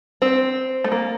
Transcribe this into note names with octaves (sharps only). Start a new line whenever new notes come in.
C4
A3
A#3